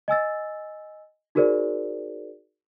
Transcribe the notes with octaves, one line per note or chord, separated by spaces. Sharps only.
D#5 G#5 E6 A6
D#4 F#4 G#4 A#4 C5 D5